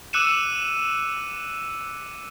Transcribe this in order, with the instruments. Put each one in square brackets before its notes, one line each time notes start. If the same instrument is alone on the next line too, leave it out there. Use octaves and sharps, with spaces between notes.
[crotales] D6 E6 F#6 C#7 D#7 E7